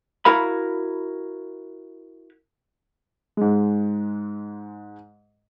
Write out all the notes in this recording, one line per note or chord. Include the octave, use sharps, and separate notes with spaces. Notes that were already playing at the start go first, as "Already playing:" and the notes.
E4 F#4 A#4 F5 B5
G#2 G#3